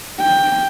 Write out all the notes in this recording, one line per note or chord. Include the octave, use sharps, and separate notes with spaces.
G5